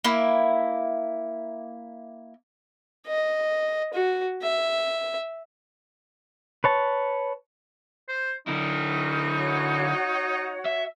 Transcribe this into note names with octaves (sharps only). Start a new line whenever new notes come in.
A#3 E4
D#5
F#4
E5
B4 C#5 A5
C5
D3 D#4 E4 F6
F#4 C#5 F#5
E5